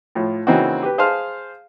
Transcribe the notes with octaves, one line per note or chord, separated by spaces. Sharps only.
A2 F3
C#3 E3 A#3 C4 D#4 F#4
G4 B4
G#4 C5 F5 A5 C6 F6